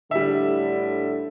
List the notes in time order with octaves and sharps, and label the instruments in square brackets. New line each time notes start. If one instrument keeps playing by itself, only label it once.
[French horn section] A2 D3 [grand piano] G3 E5